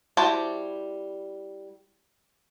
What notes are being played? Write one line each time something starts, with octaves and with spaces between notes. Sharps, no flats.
G3 E4 F#4 C5 A5